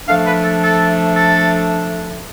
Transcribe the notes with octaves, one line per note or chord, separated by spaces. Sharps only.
F3 A3 D4 F5
B4
A4
A4
A4